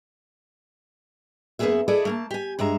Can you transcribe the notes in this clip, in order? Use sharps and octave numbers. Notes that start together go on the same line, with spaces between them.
F#2 A#3 B3 G4 G#4 E5
E4 G#4 A4 B4 D5 D#5
A3 A#3 A5
G4 G#5
G2 G#3 E5 A#5